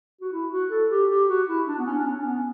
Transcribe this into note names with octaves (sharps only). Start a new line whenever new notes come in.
F#4
E4
F#4
A4
G4
G4
F#4
E4
D4
B3
C#4
D4
C#4
B3